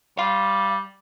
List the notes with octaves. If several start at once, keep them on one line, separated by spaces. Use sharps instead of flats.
G3 F5 C6